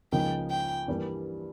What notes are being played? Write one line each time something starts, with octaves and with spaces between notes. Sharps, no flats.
C#2 C#3 F3 A#3 D#4 G5
G5
G2 E3 G3 A#3